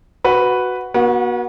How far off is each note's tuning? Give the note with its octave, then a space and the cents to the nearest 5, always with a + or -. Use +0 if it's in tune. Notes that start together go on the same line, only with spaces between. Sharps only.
F#4 +0 B4 +0
B3 -45 F#4 +0